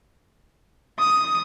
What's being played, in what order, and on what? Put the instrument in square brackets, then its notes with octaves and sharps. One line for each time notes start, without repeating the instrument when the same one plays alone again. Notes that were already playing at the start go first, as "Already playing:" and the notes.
[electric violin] D#6